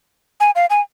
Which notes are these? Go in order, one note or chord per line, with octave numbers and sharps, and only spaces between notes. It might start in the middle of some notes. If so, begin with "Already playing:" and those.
G#5
F5
G#5